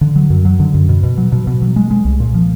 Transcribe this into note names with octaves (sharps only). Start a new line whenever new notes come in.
D3
F#3
F#2
F#3
D3
F#2
B2
B2
F#3
B2
B2
F#3
G#3
G#3
C2
A#2
F3